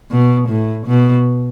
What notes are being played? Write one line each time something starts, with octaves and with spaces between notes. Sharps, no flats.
B2
A2
B2